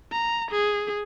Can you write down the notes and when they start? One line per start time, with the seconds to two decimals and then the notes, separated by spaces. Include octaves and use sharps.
0.12 A#5
0.51 G#4